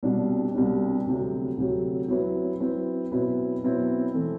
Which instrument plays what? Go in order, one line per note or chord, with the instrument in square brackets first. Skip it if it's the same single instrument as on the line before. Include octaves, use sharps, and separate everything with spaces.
[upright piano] C2 B2 G3 D4
C2 B2 G3 D4
D2 C3 F#3
D2 C3 F#3
F#3 C4 E4 B4
F#3 C4 E4 B4
B2 F#3 C4 E4 B4
B2 F#3 C4 E4 B4
E3 A3 C4